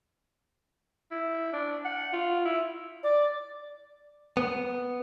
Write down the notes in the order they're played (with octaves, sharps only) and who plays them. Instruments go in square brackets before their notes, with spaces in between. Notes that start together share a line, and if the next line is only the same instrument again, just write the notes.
[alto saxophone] E4
D4
F#5
F4
E4
[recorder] D5
[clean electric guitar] B3